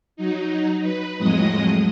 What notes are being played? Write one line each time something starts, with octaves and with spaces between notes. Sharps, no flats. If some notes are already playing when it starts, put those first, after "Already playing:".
F#3 D#4
B4
F2 A2 F#3 G#3 D#5 D#6